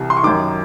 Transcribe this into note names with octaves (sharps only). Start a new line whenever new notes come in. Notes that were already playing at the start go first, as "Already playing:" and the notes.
Already playing: C2 C3 E3
C6
C#6
F#2 D#3 D6